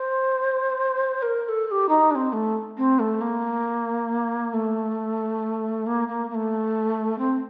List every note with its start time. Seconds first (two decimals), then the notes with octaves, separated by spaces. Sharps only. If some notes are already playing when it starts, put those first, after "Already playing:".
Already playing: C5
1.22 A#4
1.45 A#4
1.48 A4
1.66 A4
1.71 G4
1.89 D#4
2.11 D4
2.15 C4
2.32 A3
2.77 C4
2.99 A3
3.21 A#3
4.53 A3
5.86 A#3
6.08 A#3
6.30 A#3
6.34 A3
7.18 C4